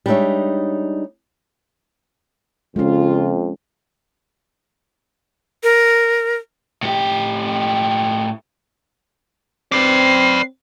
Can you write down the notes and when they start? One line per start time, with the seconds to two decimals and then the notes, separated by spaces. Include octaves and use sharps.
0.06 G3 G#3 D4 D#4 C#5 E5
2.76 F2 C#3 G#3 C#4 F4
5.63 A#4
6.83 A2 G4
9.72 C4 B4 D5 C7